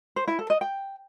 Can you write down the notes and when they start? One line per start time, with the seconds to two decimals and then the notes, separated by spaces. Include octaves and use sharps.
0.16 C5
0.28 E4
0.39 A4
0.50 D#5
0.61 G5